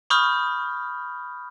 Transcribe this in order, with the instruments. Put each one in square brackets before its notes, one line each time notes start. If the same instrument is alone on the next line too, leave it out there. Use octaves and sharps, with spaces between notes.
[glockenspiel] B5 C#6 D#6 F6 G6